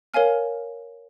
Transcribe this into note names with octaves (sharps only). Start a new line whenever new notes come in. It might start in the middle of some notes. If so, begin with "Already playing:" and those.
A#4 C#5 F5 G#5 F6